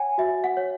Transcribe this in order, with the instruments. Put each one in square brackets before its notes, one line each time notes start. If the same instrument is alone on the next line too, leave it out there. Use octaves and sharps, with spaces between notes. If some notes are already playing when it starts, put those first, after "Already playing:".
Already playing: [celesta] C#5 F#5 G#5
F#4 E5
F#5
C#5